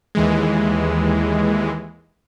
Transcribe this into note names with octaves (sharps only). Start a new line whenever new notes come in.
D#2 E3 G#3